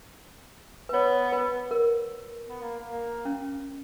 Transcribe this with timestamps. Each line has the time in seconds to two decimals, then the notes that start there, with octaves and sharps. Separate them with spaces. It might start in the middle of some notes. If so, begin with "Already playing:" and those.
0.89 B4
0.93 B3 C#5
1.33 B4
1.71 A#4
2.48 B3
2.62 A#3
2.90 A#3
3.25 C#4